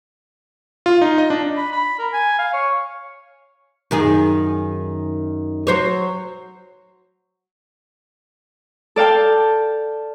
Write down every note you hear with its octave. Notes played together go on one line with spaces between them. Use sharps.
F4
D#4
D#5
D4
B5
B5
A#4
G#5
F5
C#5
F#2 D#3 G#4
F#3 C5 C#5
A4 D5 F5 G5 A5